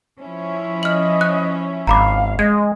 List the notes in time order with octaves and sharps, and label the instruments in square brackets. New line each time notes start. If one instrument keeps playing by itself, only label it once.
[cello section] F3 C#4 E4
[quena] D#5 [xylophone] F6 F#7
[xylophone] F#6
[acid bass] G#1 [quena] F5 [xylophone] A#5 B5 D6
[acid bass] G#3 [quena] D#5 [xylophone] G#6